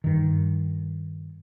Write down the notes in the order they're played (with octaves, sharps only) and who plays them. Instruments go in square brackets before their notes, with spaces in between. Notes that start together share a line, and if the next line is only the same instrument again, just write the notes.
[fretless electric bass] G2 D#3